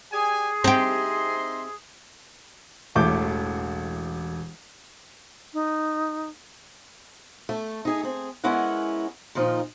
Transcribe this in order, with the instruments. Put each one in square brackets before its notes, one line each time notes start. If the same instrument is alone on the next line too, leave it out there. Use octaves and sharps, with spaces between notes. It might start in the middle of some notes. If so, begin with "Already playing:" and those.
[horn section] G4 D5 G#5 [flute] G#4
[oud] C4 G4 [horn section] D#4 E5 C6
[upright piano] E1 A1 A3 D6 G6
[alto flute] D#4
[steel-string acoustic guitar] A3
D#4 G#4
C4 G#4
G#3 B3 C#4 E4 A#4 F#5
A#2 D#3 F3 D#4